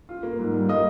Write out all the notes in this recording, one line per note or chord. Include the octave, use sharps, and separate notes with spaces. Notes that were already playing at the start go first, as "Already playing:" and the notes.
F4
A#3
G#2
G3
A#3 D#5 D#6